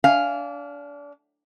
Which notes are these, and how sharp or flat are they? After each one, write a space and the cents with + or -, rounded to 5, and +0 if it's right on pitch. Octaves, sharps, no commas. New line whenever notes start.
D4 -30 F5 +0 G#5 +0